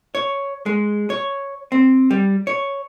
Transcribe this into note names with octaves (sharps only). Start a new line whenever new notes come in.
C#5
G#3
C#5
C4
G3
C#5